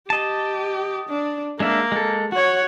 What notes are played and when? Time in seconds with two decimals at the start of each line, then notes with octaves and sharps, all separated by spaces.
0.10 G4 D#5 A5
1.09 D4
1.60 G#3 A#3 D4 E5
1.92 G#3 A4
2.32 F#4 C#5 F#5